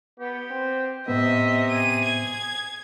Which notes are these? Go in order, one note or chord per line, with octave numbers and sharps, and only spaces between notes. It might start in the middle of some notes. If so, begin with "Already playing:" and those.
B3 G4
C4
A2 C3 B3 D#5 E5
G#4 D#7
G#6